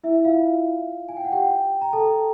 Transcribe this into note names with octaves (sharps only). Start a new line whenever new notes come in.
E4 E5
F4 F5
G#5
G5
F#5
G4 G5
A#5
A4 A5